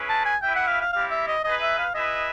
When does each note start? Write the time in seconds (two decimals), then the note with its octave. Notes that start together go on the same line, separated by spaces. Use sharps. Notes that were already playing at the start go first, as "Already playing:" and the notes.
Already playing: C#4 E4 G#4 B4
0.09 A5
0.25 G#5
0.42 E4 G4 B4 E5 G5
0.56 F#5
0.68 F5
0.81 F5
0.93 G3 C4 E4 G4 F5
1.11 E5
1.28 D#5
1.44 D#4 G#4 B4 D#5
1.61 E5
1.78 F5
1.94 E4 G#4 B4 D#5 E5